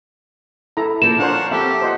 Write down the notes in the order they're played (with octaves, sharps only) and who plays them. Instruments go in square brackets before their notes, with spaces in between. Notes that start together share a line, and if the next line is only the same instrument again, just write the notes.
[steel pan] E4 A4 A#5
[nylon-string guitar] F3 A#3 A#4 [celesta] E7
[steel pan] D4 C5 [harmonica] C#5 F5 F#5
[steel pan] C4 E5 [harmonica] G4 A4
[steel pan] C5 D#5 F#5